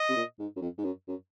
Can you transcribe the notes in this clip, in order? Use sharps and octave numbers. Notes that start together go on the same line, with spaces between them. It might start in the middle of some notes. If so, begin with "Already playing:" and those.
Already playing: D#5
C3
A#2
G#2
F#2
F2
G#2
F#2
F#2